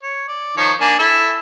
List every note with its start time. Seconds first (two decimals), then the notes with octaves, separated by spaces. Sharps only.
0.03 C#5
0.28 D5
0.57 D#3 F3 C#5
0.81 A#3 D4 G#5
0.99 E4 A4